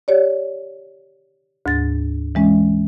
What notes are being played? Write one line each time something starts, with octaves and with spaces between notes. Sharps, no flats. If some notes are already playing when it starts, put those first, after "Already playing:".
G4 C#5 D5
D2 G#2 A6
E3 G#3 C#4